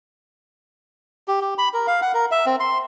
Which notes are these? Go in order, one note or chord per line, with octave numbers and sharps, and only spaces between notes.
G4
G4
B5
A#4
F5
F#5
A#4
E5
C4
C6